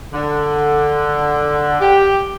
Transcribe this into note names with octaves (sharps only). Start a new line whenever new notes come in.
D3
G4